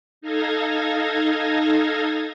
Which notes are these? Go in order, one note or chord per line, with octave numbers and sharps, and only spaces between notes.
D#4 A4 F5 G#6 A#6